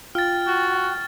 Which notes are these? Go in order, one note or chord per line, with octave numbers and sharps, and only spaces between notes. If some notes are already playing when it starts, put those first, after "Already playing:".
F4 G5 F6 A6
F#4